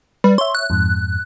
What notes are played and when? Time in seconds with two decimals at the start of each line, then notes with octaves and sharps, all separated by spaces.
0.24 G3 B4
0.38 C#5 E5 C6
0.55 F#6
0.70 F2 G#2